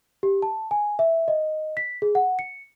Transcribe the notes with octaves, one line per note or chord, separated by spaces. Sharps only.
G4
A5
G#5
E5
D#5
B6
G#4
F#5
C#7